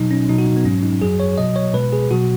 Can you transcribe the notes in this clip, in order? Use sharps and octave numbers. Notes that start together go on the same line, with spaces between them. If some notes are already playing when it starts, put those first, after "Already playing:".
Already playing: B2 F#3 D#4
C#4
B2 F#3 D#4
F#4
D#4
B3
G#2 F#3 C#4
D#4
F#2 F#3 G#4
C#5
B2 F#3 D#5
C#5
B2 G#3 B4
G#4
B2 F#3 F#4